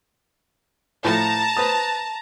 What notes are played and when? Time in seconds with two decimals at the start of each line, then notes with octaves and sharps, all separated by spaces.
1.05 A2 F3 A3 A5 A#5
1.57 B4 C5 D#6